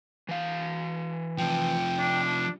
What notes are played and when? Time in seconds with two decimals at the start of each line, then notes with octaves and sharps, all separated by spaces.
0.29 E3 F5
1.38 C3 F3 G5
1.99 D4